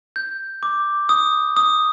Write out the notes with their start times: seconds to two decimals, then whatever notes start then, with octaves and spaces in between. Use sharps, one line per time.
0.16 G6
0.63 D6
1.09 D#6
1.57 D#6